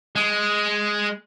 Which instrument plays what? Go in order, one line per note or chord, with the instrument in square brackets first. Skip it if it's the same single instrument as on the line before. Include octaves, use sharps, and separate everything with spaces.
[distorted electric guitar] G#3